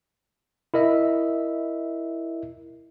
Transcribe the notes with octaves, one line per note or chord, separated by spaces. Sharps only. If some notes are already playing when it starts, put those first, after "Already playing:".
E4 A#4 D#5 E5